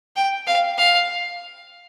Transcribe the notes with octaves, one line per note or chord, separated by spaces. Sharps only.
G5
F5
F5